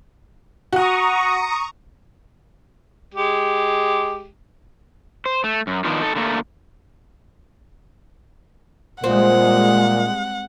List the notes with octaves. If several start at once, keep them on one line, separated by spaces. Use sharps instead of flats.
F#4 F#5 A#5 C#6 D#6
G#3 G4
C5
A3
F#2
D#3 F3 B3 D4 D#4 F4
D#4 A4
D3 A3 A#3
A#2 G3 G#3 C4 F#5